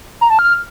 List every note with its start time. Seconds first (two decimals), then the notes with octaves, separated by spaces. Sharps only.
0.21 A#5
0.30 A5
0.39 F6